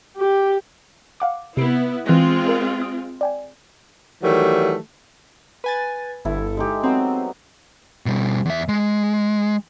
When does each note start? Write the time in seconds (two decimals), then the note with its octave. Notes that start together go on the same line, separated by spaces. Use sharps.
0.18 G4
1.20 F5 F#5 D6
1.57 C3 B3 E4 C7 D7
2.06 E3 G#3 C4 F4 F#6 A#6
2.48 A#4
2.82 D#6 D7
3.21 D5 G5 G#5
4.23 D#3 E3 F#3 G3 A3
5.64 B4 G#5 A6
6.25 G1 E4 A4
6.57 G#3 D#4 G4
6.83 F#3 B3 C4
8.06 B2 G3
8.46 E2 E5
8.69 G#3